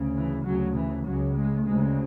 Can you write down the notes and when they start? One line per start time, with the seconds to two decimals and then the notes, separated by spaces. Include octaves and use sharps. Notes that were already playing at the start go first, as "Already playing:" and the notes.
Already playing: D2 C#3
0.17 E3
0.46 D2 C#3 F#3
0.77 E3
1.07 C#2 C#3 F#3
1.37 G#3
1.67 D2 C#3 G#3